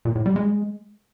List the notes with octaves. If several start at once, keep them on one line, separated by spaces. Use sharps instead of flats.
A#2
A2
G3
G#3